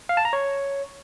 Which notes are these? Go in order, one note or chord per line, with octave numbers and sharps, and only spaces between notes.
F5
A5
A#5
C#5